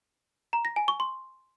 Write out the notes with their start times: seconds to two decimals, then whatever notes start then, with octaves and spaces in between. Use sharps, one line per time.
0.53 A#5
0.65 A#6
0.76 G#5
0.88 C#6
1.00 C6